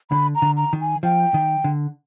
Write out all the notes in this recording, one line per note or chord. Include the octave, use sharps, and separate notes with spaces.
D3 B5
A#5
D3
A#5
D#3
G#5
F3 G5
D#3
D3